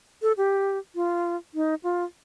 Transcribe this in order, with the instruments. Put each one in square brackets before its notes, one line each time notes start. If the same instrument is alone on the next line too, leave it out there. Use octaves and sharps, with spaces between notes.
[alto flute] A4
G4
F4
D#4
F4